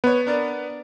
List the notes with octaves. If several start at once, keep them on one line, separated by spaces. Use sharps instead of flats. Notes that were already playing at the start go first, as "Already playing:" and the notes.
B3 B4 C#5
D4 A#4 D5